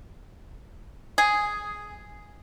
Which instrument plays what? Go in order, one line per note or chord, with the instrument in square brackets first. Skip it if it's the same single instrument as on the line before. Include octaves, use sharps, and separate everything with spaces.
[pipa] G#4